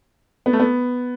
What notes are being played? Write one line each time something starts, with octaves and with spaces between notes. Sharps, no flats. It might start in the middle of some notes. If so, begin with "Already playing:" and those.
B3
A3
B3